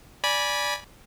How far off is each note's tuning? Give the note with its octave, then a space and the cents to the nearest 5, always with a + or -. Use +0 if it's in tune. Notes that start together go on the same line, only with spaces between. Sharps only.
D5 -5 G#5 +0 B5 -20